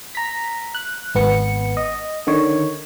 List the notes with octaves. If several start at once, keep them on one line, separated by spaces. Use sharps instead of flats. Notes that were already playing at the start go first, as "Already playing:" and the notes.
A#5 B6
F#6
G#1 B3 C#7
D#5
D3 D#3 C#5